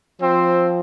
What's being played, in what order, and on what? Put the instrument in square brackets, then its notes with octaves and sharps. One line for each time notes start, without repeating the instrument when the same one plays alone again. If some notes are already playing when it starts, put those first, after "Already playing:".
[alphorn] F3 [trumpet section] C4 C5